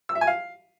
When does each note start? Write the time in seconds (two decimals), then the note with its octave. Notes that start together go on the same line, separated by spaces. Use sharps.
0.09 E6
0.15 E5
0.21 G#5
0.27 F5